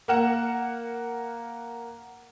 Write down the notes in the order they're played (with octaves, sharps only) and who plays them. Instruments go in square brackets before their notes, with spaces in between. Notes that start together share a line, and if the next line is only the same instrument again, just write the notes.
[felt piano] A#3 A#4 F#5 E7